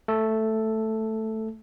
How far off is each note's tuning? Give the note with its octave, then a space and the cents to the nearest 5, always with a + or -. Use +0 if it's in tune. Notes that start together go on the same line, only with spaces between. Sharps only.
A3 +0 A4 +0